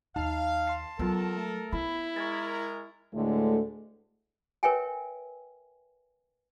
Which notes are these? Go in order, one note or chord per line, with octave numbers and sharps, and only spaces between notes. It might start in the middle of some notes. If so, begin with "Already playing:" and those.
D#2 D#4 F5 A5
A5 C6 C7
F#3 G#3 B3 F4 A4 A#4
A3
B3 E4 B5
G#3 A#4 C#6 G#6 A6
D2 A2 D3 G#3 A3
A#4 B4 C#5 E5 G5 G#5